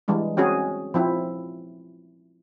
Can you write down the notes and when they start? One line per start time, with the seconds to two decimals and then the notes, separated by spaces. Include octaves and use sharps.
0.08 E3 G3 G#3 D4
0.37 C4 C#4 F#4 G#4
0.94 F3 C4 E4